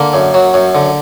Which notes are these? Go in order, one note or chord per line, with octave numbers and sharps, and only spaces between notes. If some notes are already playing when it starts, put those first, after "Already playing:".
Already playing: D3 A#3
F#2
F#3
F#2
D3